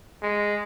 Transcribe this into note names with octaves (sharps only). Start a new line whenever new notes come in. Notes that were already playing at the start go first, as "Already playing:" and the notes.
G#3